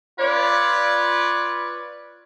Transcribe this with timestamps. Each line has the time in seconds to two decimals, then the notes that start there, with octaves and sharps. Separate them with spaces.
0.19 F4 B4 C#5 D5